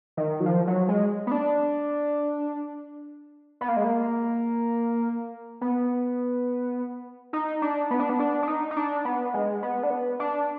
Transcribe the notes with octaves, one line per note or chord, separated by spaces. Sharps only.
D#3
F#3
F3
F#3
G#3
B3
D4
B3
A#3
G#3
A#3
B3
D#4
D4
B3
D4
B3
D4
D4
D#4
D#4
D4
B3
G#3
B3
D4
B3
D4